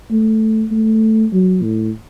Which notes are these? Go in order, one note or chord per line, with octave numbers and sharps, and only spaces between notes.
A3
A3
F#3
A2